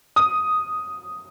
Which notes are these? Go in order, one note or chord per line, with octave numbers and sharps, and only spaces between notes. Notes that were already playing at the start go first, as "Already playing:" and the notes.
D#6